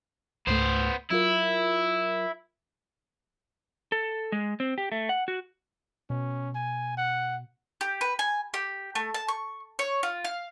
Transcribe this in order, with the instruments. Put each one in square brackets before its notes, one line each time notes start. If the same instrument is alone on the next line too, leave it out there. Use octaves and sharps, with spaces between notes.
[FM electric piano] C#2 G#2 A3 [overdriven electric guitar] B3 C5
[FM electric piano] F#3 F4 A#4 [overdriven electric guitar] E4
[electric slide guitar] A4
G#3
C4
G4
A3
F#5
F#4
[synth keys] B2 [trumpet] C#4
[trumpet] G#5
F#5
[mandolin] G4
B4
G#5
G4
A3
A5
C#6
C#5
F4
F5